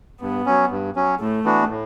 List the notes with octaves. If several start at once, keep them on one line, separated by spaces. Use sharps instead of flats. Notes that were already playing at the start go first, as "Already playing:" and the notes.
G2 B3
F#3 C#4
G2
F#3 C#4
A2 A3
E3 B3 D4 F#4
A2